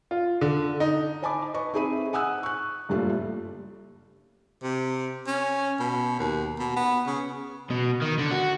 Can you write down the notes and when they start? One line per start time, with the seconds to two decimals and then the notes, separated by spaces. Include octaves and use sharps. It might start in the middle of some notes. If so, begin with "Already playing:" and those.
0.11 F4
0.41 D3
0.80 D#4
1.22 C5 D#5 G#5 A5 B5 D6
1.54 B4 D#5 C#6
1.73 C4 D#4 G#4 E5 B5 D#7
2.13 F#5 G#5 D#6 E6 F#6
2.43 C#6 F#6
2.89 F#1 G2 A#2 G3 A3 F4
4.63 C3
5.27 C#4
5.80 B2
6.19 D#2
6.59 B2
6.77 B3
7.06 C#3
7.71 B2
8.02 D#3
8.19 D3
8.32 F#4